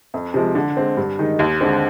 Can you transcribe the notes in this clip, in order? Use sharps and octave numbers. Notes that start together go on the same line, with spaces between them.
F2
C3 F3 G#3
D3
G#3 C4
G2
D#3 G#3 D#4
D#2
D3 G#3 C4